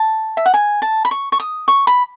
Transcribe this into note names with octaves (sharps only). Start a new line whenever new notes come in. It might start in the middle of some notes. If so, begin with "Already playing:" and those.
Already playing: A5
E5
F#5
G#5
A5
B5
C#6
C#6
D#6
C#6
B5